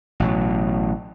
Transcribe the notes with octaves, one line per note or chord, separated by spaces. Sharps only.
A1 B2 F#3